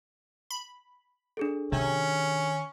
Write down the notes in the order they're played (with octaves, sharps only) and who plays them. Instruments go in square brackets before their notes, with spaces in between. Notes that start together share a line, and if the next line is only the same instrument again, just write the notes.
[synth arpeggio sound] B5
[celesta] D4 G#4 A4
[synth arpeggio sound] C3 [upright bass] D#3 [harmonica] C#4